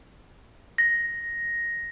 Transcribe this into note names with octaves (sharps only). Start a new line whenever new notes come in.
A#6